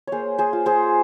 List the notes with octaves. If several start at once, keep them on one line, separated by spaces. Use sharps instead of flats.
A#3 G#4 C5 C#5
G#4 C5
F4
G#4 C5